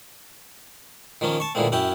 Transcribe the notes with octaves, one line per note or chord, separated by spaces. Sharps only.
D#3 F3 A#3 C#4
A5 C#6
A#2 D3 E3 G#3 A#3 C4
F#2 C#4 E4 G5